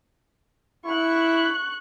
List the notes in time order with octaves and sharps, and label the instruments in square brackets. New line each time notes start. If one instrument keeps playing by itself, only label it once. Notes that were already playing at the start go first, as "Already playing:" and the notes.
[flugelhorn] E4 [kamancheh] C#6 F#6